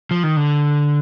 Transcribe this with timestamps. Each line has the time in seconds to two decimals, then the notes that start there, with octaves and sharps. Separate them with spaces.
0.11 F3
0.23 D#3
0.37 D3